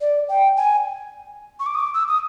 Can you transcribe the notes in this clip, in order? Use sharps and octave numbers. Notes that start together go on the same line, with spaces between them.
D5
G5
G#5
C#6
D6
D#6
D6
E6
D#6